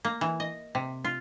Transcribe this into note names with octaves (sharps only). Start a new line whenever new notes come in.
A#3
E3
D#5
C3
F4